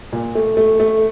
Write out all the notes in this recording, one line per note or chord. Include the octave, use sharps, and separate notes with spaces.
A#2
A3
A3
A3